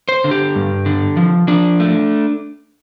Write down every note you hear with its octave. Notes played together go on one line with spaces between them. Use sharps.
C5
D3
G4
G2
D3
F3
F3 D4
A3